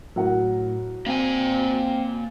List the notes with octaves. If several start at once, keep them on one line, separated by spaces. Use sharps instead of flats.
A2 F#3 A#4 F#5
A#3 C4 G#5